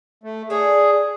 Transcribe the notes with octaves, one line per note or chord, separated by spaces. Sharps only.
A3
D4 G#4 C#5